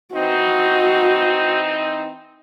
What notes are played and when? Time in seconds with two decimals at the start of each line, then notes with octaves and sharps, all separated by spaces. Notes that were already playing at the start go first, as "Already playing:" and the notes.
0.15 E3 C4 D#4 F#4